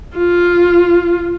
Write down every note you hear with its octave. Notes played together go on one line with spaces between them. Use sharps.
F4